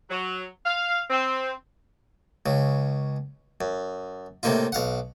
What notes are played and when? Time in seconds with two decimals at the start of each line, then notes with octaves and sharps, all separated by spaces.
0.10 F#3
0.66 F5
1.10 C4
2.46 C#2 C#3
3.61 F#2
4.43 A2 C3 A#3 D#4 F4
4.72 B1 F5 F#5